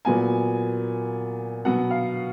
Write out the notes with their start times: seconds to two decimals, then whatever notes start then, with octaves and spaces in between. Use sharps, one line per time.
0.05 A#2 F#3 B3 G#5
1.65 B2 F#3 B3 F#5
1.90 F5